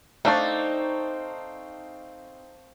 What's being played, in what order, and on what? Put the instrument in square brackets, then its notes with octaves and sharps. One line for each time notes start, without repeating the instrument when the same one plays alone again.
[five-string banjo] A3 D4 D5 [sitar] C4 [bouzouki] D#4 [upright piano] F5 A5 C#6